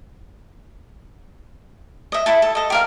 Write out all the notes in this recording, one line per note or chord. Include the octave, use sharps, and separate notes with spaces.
D#5 E5
E4 A4 A5
A4
A4 D#5
G4 A#4 F5